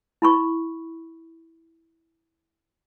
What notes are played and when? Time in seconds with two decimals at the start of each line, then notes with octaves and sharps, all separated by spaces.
0.22 E4 B5 C#6